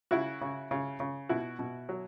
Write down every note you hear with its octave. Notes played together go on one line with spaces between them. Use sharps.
C#3 E4 F#4
C#3
C#3
C#3
B2 E4 F#4
B2
F#3